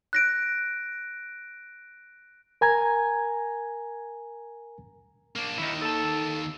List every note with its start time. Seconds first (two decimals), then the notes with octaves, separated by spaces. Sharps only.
0.13 F#6 A#6 D7
2.61 A#4 G#5 A#5 G#6
5.36 A#3 D4
5.58 D#2 D#3 D#4 E4
5.82 A4 A5